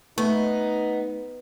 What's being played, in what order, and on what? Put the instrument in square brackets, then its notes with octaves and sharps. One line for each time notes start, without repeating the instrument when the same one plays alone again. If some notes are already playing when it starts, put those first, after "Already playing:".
[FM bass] A3 [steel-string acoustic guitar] B3 [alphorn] D#4